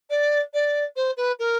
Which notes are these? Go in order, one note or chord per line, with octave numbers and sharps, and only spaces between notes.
D5
D5
C5
B4
A#4